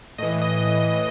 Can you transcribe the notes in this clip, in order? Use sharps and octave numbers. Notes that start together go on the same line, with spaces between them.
A2 E3 D#5
D#5